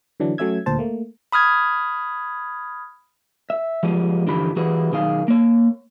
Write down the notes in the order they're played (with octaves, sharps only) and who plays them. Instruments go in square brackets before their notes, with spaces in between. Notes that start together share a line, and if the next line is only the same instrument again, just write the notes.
[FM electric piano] D3 E3 F#3 D4
F#3 A3 C#4 E5 E6 G#6
D2 A#2 C5 A5
A3 A#3
[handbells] B5 D#6 F6 G#6
[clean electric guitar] E5
F3 G3 G#3 B3
G2 D3 E3 F3 G4 B5
E3 G3 E4 F#4 G#4 B4
B1 D#3 G#4 F5
A#3 C#5